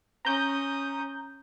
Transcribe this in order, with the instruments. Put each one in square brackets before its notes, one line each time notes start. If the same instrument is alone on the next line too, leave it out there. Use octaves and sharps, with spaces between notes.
[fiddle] C#4 D#6 [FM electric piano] A#5 G6